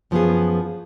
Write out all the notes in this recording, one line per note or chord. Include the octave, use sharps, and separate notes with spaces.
F#2 F3 B3 F4 G#4